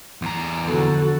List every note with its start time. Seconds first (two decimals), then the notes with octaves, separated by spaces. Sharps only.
0.22 E2 A#5
0.67 D3 F3 B3 F#4 A4